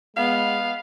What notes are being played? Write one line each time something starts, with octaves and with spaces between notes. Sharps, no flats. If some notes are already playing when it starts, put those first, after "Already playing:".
G#3 B3 F5